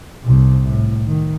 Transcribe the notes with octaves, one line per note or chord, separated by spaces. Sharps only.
C2 C3
A2
D#3